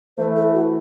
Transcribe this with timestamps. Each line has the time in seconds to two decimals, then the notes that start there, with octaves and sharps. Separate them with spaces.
0.17 E3 A3 E4 C5
0.36 A4
0.54 F#4